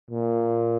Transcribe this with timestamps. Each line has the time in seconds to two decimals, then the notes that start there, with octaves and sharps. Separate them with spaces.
0.11 A#2